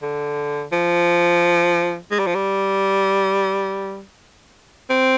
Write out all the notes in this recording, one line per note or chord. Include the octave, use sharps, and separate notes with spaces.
D3
F3
G#3
G3
F3
G3
C4